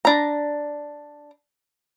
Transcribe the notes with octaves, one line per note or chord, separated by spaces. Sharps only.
D4 A#5